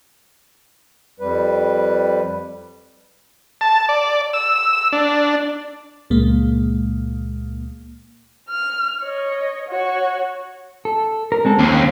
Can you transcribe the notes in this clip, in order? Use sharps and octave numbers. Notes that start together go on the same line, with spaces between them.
F2 G3 B4
A5
D5
E6
D4
C#2 A#2 G#3 A#3
F6
C#5 D#5
F#4 C#5
A4
A#4
G#3 C4 A4
D#2 C#4 C5